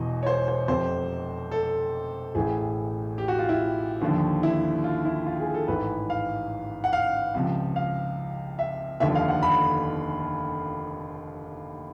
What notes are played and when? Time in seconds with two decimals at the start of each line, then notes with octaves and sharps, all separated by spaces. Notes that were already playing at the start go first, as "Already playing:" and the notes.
Already playing: E1 E2 E3 D#5
0.23 C#5
0.27 C5
0.48 C5
0.68 F1 F2 C3 C5
1.51 A4
2.35 A1 A2 E3 G#4
3.18 G4
3.28 F#4
3.39 F4
3.49 E4
4.01 D#2 D3 F3
4.43 E4
4.84 F4
5.05 E4
5.26 F4
5.40 G#4
5.54 A4
5.68 A1 G#2 E3 B4
6.10 F5
6.84 F#5
6.93 F5
7.34 C#2 C3 F3
7.76 F5
8.59 E5
9.00 F1 D#2 D3 F3 E5
9.15 F5
9.28 F#5
9.43 B5